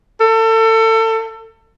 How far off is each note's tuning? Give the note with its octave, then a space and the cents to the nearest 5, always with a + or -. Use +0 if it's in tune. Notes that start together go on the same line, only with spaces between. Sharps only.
A4 +30